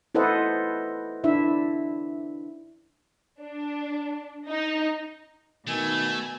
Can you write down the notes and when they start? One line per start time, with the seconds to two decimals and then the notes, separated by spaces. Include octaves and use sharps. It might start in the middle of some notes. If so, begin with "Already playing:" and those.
0.15 E4 A4 B4 C5 D#5 F#5
1.24 D4 E4 E5
3.40 D4
4.47 D#4
5.67 B2 D#3 A3 G#5 E6